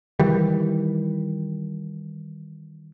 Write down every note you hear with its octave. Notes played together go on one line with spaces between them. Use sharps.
D#3 E3 G3